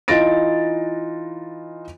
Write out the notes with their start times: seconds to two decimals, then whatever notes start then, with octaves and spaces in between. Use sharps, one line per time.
0.08 E3 D#4 F4 A6 A#6 D7